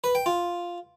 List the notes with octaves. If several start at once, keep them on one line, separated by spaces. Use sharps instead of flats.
B4
G5
F4